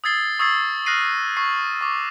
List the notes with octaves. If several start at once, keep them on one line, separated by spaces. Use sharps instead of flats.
D#6 E6 G#6 A6 C7 G7
C#6 D#6 E6 G#6 A6 C7
D#6 F6 F#6 A#6 C7 D#7
C#6 C7
C#6 D6